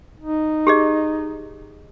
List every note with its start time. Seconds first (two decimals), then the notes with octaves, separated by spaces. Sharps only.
0.20 D#4
0.67 G4 G#4 D#5